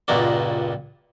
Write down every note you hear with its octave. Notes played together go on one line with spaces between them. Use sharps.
C#2 G2 A#2 A#3 F#4 D5